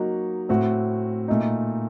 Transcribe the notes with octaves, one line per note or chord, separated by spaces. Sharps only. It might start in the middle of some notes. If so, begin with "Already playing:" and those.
Already playing: F#3 A#3 D#4 F#4
A2 A3 C4 F#4
A#2 A3 D#4